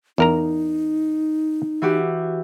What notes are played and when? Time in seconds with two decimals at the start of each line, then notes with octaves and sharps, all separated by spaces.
0.18 E2 D#4 A#4 A#5
1.82 E3 F#4 G4